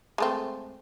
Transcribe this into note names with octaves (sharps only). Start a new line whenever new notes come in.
G#3 A3 C4